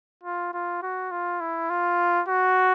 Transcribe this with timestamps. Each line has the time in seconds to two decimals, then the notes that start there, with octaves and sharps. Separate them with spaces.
0.24 F4
0.53 F4
0.82 F#4
1.11 F4
1.41 E4
1.70 F4
2.28 F#4